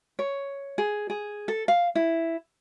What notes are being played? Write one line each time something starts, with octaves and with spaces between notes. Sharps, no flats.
C#5
G#4
G#4
A4
F5
E4